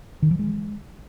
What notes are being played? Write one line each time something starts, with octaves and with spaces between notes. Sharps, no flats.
D#3
F3
G#3